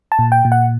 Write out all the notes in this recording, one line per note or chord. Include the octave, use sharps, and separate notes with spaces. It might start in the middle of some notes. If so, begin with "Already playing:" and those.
A5
A#2
G5
A#2
F#5